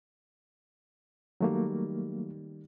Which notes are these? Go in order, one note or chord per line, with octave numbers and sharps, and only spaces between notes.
D#3 F#3 G3 A3 A#3